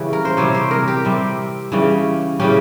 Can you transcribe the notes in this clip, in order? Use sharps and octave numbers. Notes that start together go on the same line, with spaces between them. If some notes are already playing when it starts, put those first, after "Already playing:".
Already playing: C#3 E3 G3 C#4
A#4
C5
C3 G3 C4 C#5
C5
A#4
G4
C3 G3 C4
C#3 E3 G3 C#4
C#3 E3 G3 C#4 G4